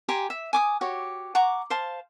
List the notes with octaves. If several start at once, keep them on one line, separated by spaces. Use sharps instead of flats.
G4 G#5 A#5 C6
E5
G#5 D6 D#6
F#4 G4 C#5
F#5 A#5 C#6 D6
C5 F5 A5